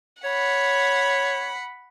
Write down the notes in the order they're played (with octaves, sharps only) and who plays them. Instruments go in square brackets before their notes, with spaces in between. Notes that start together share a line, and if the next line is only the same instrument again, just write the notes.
[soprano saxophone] C#5 [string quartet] F#5 B5